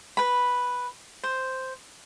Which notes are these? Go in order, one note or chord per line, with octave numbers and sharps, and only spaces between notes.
B4 B5
C5